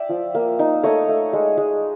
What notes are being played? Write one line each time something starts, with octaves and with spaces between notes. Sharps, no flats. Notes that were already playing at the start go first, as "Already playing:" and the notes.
Already playing: D5 E5 G5
F3
A#3
D#4
A3 C#5 D#5
A3
G#3
G#3